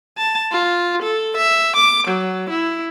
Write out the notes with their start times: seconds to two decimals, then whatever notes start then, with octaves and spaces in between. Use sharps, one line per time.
0.18 A5
0.51 F4
1.03 A4
1.37 E5
1.76 D6
2.08 F#3
2.50 E4